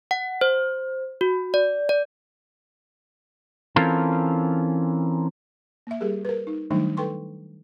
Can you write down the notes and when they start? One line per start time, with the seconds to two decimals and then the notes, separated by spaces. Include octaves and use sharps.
0.11 F#5
0.41 C5
1.21 F#4
1.54 D5
1.89 D5
3.76 E3 C4 C#4 F4 A4 A#4
5.87 A#3 E5
6.01 G3 G4 G#4 A#4
6.25 A#4 B4
6.47 D#4
6.71 D#3 F#3 G3 A3 D4 D#4
6.97 A4 B4 G5 C6 C#6